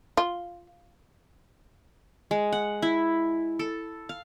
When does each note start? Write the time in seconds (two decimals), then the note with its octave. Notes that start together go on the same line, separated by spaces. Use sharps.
0.17 F4
2.31 G#3
2.52 F#5
2.82 E4
3.59 A4
4.09 F5